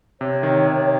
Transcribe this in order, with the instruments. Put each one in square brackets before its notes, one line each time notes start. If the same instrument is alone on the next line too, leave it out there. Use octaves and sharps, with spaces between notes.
[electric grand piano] C3 [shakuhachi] C#5
[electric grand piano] D#3
C3